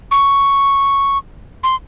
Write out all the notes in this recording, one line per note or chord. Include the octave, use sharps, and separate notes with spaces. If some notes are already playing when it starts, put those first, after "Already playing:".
C#6
C6